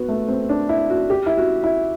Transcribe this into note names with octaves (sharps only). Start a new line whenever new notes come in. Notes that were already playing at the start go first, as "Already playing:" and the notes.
Already playing: B3 F#4
A3
C4
D4
E4
F#4
G4
E4
F#4
E4